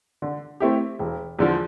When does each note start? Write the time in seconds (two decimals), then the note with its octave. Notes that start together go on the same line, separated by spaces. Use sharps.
0.22 D3
0.60 A3 C4 E4 G4
0.99 E1
1.39 E2 D3 F3